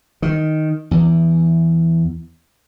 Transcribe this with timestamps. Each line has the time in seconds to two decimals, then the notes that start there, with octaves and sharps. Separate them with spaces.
0.22 D#3
0.91 E2